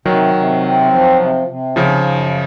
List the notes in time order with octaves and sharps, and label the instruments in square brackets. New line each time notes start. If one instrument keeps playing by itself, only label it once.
[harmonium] C3 [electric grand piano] D#3 F#3
[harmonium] C3
C4
F3
C3
C3
[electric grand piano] C#3 F3 [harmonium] D#4
[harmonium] F#2